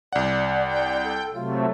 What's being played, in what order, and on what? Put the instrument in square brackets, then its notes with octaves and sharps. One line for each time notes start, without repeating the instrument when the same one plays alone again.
[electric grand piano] C2 F#5 [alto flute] D5
[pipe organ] G5
[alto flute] A4
[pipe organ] C3 F#3 A3 [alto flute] F4